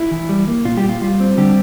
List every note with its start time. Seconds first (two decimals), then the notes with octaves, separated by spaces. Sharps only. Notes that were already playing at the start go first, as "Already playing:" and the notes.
Already playing: E4
0.11 E3
0.29 G3
0.47 A#3
0.65 A#2 F4
0.77 G3 G4
0.84 A#2
0.89 F4
1.01 G3 F4
1.20 C4
1.37 D3 G3 G4